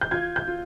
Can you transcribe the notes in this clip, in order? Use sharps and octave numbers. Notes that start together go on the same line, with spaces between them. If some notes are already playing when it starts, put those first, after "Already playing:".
G6
F4 G#6
G6
F4